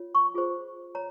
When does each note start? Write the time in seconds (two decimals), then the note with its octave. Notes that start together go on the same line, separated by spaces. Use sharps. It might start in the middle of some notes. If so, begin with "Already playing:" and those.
Already playing: F4 C#5
0.15 C#6
0.34 F4 G#4 C5
0.95 C#5 A#5